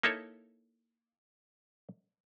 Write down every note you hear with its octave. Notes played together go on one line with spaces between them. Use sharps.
A#3 D#4 E4 A4 C#5